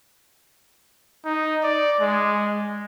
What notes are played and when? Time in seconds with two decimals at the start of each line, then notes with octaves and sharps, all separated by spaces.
1.24 D#4
1.63 D5
2.00 G#3